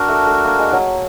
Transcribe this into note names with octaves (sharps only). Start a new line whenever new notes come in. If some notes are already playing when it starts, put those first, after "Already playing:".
Already playing: D4 F#4 A#4
A3
A3
A#3
G#3
F#3